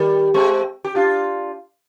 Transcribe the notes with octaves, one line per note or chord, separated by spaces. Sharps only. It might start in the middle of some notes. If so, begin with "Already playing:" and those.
Already playing: D#3 G3
G#3 C4
G4
D4 F4